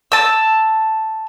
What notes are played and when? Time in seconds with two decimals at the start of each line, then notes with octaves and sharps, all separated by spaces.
0.12 A5 E6